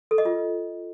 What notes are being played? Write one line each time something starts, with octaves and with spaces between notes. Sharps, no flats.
A4
D#5
F4